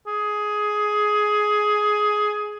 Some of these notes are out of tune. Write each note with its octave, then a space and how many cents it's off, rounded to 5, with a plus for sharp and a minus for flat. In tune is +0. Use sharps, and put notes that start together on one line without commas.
G#4 +10